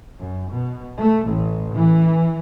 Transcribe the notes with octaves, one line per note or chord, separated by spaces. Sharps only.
F#2
B2
A3
A1
E3